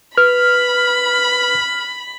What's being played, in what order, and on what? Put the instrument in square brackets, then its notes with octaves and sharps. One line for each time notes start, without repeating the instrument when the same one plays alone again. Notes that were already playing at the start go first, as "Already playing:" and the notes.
[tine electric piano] B4 [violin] B5 [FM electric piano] F6